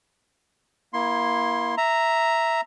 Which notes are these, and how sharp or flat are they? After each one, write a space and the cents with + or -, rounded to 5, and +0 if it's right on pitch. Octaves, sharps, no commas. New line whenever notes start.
A#3 +25 E4 -5 C6 +10
E5 +0 A#5 +0